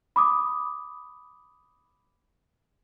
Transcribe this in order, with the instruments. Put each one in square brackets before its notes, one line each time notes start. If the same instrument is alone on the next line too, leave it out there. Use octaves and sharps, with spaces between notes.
[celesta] B5 D6 D#6